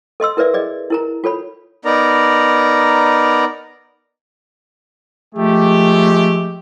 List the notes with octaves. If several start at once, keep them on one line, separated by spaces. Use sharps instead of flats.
A4 D#5 C6 E6
E4 A#4 B4 D5 E5
G#4 D5 D#5
E4 A#4 A#5
F4 A4 C#5 B5
B3 D#4 A#4 D5 A#5
F3 G#3 A3 G4